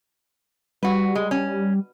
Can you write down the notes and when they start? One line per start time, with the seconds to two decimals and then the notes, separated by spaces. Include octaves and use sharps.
0.83 G3 F#4 B4
1.15 G#3
1.31 C#4